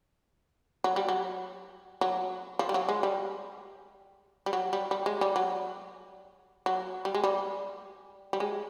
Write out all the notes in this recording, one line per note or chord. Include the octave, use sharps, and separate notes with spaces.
F#3
G3
F#3
F#3
F3
G3
F#3
G#3
G3
G3
F#3
G3
G3
G#3
G3
F#3
F#3
G3
G#3
G3
G3
G#3